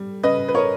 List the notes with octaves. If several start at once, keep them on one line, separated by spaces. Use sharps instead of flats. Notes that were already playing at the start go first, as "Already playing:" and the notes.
Already playing: G3
C#3 B4 D#5
B4
A#4 C#5